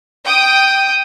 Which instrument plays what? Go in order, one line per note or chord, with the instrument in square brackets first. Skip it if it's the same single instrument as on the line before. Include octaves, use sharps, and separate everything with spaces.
[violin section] G5 D#6